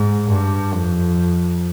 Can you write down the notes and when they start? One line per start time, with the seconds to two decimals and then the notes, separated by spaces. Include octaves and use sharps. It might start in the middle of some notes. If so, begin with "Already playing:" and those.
Already playing: G#2
0.29 G2
0.74 F2